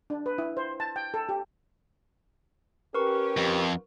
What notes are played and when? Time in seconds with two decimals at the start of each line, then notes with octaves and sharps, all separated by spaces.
0.10 D4
0.26 B4
0.38 E4
0.57 C5
0.80 A5
0.96 G5
1.14 A4
1.29 G4
2.94 C#4 G4 A#4 B4 C#6
3.37 F2